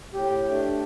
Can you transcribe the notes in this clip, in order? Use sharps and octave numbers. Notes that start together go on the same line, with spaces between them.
A2 G4
A3 D4